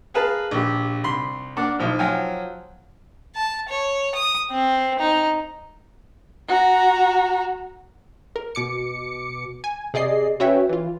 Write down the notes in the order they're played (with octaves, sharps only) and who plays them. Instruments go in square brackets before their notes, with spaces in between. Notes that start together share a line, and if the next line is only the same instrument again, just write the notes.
[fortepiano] G#4 A#4 B4 F5 A5
A#1 G4
C2 B5 C6
A#3 D4 D5 F#5
B1 F3 E4
F3 F#3 F5 G5 G#5
[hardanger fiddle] A5
C#5
D#6
C4
D#4
[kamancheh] F#4 A#5
[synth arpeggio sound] A#4
B2 D6 C#7
G#5
C3 G#4 D5 D#5 C7
C#4 F#4 B4 C#5 E5 G5
E3 F4